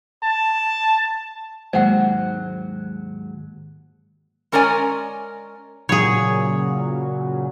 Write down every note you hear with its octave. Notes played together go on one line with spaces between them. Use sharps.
A5
D#2 G#2 F#3 G#3 A#3 C5 F#5 G5
G#3 C#4 A#4 C#5 D5 G#5
A#2 C#3 F#3 G#4 C#5